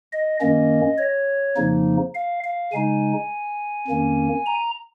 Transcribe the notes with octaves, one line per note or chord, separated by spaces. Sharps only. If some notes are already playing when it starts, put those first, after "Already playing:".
D#5
F#2 D#3 A#3 C#4 D#5
C#5
F2 C#3 F3 A#3 D#4
F5
F5
C#3 G#3 D#4 G#5
F2 D#3 A#3 C#4
A#5